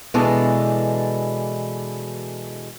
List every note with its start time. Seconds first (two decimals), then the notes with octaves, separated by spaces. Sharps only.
0.14 B2 E3 G#3 D4 A4